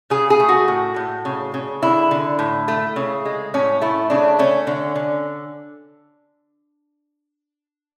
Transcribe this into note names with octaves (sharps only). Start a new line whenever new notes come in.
C#3 G#4
G#4
A3
F#4
A2
A2
C#3
C#3
D3 E4
D3
A2
A3
C#3
G#3
A2 C#4
A3 E4
C#3 D4
A3 C#4
D3
D3